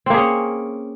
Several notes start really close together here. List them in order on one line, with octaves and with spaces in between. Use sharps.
C4 A#3 G#4 C#4